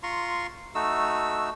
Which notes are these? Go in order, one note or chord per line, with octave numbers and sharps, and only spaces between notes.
F4 A#5 C6 C#6
A3 D#4 F#4 E6